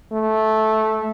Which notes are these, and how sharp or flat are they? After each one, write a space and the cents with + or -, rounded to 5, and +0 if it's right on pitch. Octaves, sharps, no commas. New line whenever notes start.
A3 -10